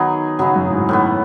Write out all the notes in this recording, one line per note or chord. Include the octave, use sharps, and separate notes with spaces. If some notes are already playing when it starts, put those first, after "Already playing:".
Already playing: D#3 F#3 B3 D#4 G#4
C#3 F#3 B3 D#4 G#4
F#2
A2
G#2
A2 E3 B3